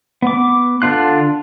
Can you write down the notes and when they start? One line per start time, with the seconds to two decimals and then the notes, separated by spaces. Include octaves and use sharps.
0.22 B3 D6
0.82 D3 D4 F4 F#6